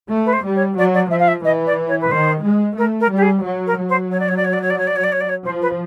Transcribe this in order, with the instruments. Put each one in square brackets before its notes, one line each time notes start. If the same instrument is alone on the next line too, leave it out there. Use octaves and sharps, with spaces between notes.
[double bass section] A3
[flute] B4
C5
[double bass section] G3
[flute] C#5
[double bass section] F#3 [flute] D5
[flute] D5
[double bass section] F3 [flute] E5
[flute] F5
E5
[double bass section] E3 [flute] D#5
[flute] D5
C#5
B4
[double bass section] D#3 [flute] C5
[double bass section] G#3
[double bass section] A3 [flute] A#4
[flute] A#4
[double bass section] G3
[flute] G4
G#4
[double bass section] F#3
[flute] A#4
[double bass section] F#3
[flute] C5
C#5
D5
C#5
D5
C#5
D5
C#5
D5
C#5
D5
C#5
D5
C#5
D5
C#5
[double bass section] F3 [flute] C5
[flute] B4